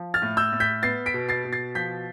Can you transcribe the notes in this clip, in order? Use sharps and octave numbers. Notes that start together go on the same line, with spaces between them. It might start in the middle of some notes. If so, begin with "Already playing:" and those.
Already playing: F3
F6 A6
A2
E6 G6
A2
G6 B6
B3 A6 C7
B6 D7
B2
A6 C7
B2
A6 C7
F3 G6 B6